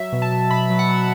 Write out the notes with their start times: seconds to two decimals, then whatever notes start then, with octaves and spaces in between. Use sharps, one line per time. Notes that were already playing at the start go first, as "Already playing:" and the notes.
Already playing: F#3 E5
0.12 B2
0.22 A5
0.32 B2
0.51 B2 B5
0.70 F#3
0.79 F#5
0.88 F#3